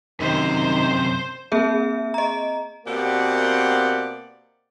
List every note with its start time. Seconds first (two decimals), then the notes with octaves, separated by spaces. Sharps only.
0.20 F#2 C3 D#3 C5
1.52 A#3 C4 G#4 E5
2.14 D#5 A#5
2.86 B2 A#3 C4 G4 D5 F#5